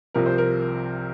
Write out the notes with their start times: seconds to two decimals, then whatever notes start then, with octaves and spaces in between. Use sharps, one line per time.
0.14 C2 C3 F3 A#4
0.26 C5
0.38 A#4